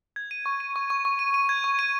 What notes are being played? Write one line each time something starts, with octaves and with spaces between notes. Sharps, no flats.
G#6
D#7
C#6
D#7
C#6
C#6
C#6
D#7
D#7
G#6
C#6
D#7